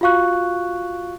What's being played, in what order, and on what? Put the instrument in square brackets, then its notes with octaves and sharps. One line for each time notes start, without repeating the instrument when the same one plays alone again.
[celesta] F4 F#4 F5 C#6 F#6